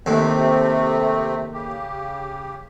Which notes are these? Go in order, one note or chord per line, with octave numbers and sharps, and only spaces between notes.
D#2 A2 C3 A3 C4
C#3 G4